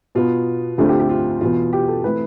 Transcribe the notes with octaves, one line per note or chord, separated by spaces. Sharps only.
B2 B3 F4
D2 D3 A3 C4 F4
G4
G4
F4
E2 B2 B3 F4
G4
A4
E3 A3 C4 B4